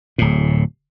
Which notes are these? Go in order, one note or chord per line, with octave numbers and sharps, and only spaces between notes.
D1 A2